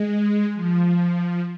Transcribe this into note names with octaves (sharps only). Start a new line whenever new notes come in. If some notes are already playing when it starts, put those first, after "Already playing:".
Already playing: G#3
F3